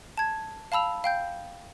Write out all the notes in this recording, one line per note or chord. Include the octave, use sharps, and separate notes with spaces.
A5 G#6
F5 A5 B5 E6 F7
F5 G5 G6